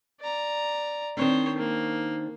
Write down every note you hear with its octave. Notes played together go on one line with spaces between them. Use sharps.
D5 A#5
D#3 C4 D4 C5 C#5
A#3